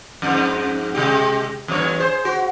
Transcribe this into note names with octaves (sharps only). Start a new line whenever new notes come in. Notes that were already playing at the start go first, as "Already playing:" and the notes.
F2 G#2
C3 G#3 G4
E2 G2 C#5
G#4 C5
F#4